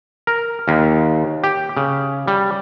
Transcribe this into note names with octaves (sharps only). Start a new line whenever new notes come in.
A#4
D#2
G4
C#3
G3